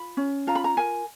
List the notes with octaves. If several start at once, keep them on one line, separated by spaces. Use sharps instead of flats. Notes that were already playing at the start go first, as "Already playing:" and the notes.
Already playing: F4 B5
C#4
F4 A#5
B5
A#5
A#4 G#5